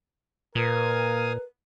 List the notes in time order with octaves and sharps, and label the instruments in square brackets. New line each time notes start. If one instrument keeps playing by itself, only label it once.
[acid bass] A#2 [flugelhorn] A#4 [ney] B4 [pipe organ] F5 G#5 D#6